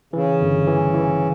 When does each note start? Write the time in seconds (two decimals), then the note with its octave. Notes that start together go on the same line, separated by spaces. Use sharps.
0.13 C#3 E3
0.41 G1
0.67 E3
0.94 E3